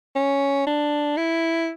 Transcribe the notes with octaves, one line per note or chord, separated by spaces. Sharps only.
C#4
D4
E4